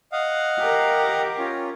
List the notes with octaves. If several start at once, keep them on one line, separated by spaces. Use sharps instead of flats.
D#5 F5 F#5
G4 A#4
C#4 F4